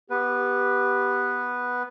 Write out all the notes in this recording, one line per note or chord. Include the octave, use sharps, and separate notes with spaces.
B3 G4 B4